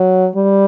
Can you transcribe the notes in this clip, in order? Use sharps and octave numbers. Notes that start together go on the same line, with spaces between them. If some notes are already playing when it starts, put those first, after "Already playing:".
Already playing: F#3
G3